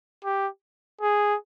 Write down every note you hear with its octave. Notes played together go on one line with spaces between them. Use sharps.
G4
G#4